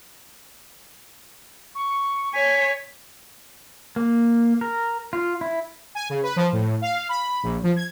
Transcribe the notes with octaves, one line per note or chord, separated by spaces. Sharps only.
C#6
C#5 G#5 B6
A#3
A#4
F4
E4
G#5
C#3
B4
F3
A2
F5
B5
A#1
F3
G#6